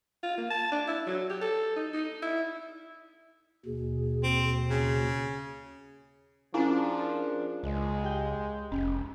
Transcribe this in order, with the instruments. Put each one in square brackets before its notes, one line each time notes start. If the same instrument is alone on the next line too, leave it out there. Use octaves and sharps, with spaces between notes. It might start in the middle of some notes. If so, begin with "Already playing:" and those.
[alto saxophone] F4
A#3
A5
D4
E4
F#3
G4
A4
D#4
D#4
E4
[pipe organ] D#2 B2 [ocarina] G#4
[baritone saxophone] C4
C#3
[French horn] F3 [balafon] C#4 E4 [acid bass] D4 [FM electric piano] F4 G#4 A#4
[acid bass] C#2 [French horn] G#3
[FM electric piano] G4 G6
[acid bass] F1 [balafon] C#4